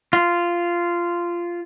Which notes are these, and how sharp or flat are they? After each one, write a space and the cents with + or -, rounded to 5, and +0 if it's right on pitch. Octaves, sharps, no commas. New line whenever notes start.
F4 -10